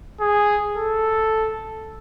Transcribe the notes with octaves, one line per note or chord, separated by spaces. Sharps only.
G#4
A4